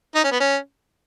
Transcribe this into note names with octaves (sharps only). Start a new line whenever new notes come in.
D#4
C#4
B3
C#4